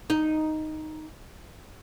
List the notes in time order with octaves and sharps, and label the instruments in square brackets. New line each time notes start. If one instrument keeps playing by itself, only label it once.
[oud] D#4